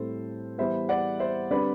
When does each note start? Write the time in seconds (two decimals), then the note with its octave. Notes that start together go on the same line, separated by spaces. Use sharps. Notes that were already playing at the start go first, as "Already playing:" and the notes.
Already playing: A2 G3 C4 A4 C5
0.58 E3 G3 B3 C5 E5
0.89 D5 F#5
1.19 C5 E5
1.51 D3 G3 C4 B4 D5